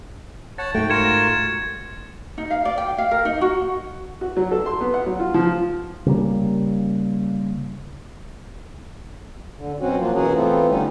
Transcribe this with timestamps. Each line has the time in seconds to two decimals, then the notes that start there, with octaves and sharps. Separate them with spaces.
0.58 C#5 F#5 A5 A6
0.75 G#2 A3 F#4 G5
0.90 F4 F#4 A#4 G#6 C#7 E7
2.38 D#4
2.50 F5
2.65 D5
2.78 G5
2.98 F5
3.11 A#4
3.25 D#4
3.41 F#4
4.21 F#4
4.37 F#3
4.51 A4
4.66 C6
4.81 B3
4.94 F#5
5.06 F#3
5.20 F4
5.34 F3
6.06 C#3 G3 A#3
9.57 D3
9.80 B2 F#3 C4 C#4 F#4
9.99 F3 F#3 A#3 F4
10.14 B2 E3 C#4 F#4 G#4 A#4
10.33 E3 A3 B3 C4 F4
10.68 D3 G3 C#4 D#4